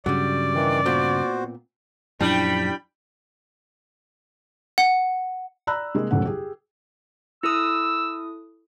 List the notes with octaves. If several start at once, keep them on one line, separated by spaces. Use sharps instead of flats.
G2 C#3 F#3 G3 D5
D#3 E3
A#2 B3 C4 F#4 C5
F#2 A#2 F3 G3 D4 E4 G5 B5
F#5
D5 A#5 B5 E6 F#6
C3 G#3 A#3 G#4
D#1 B1 F#2 A2 C#3 F#5
G4 G#4
E4 A4 D#6 E6